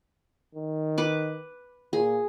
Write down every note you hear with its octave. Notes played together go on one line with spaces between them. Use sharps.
D#3
B4 D6
A#2 G#4